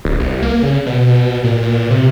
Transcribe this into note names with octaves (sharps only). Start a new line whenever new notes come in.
D1
C2
A#3
C#3
B2
B2
A#2
A#2
C3